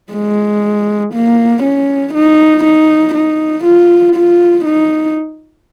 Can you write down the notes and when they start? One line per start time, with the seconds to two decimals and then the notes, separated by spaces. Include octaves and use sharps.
0.13 G#3
1.14 A#3
1.63 C#4
2.14 D#4
2.64 D#4
3.15 D#4
3.64 F4
4.16 F4
4.65 D#4